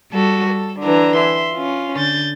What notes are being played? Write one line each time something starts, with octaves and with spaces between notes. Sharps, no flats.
G3 F#4 A4
A4
D3 E3 D4 A#5
E5 C6
C#4 F4
D3 G6 A6